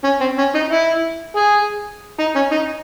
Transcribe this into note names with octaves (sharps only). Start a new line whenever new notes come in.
C#4
C4
C#4
D#4
E4
G#4
D#4
C#4
D#4